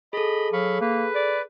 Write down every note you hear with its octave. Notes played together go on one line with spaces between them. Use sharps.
G#4 A4 D#5 B5
F#3 F5 B5 C#6
A#3 B4
D5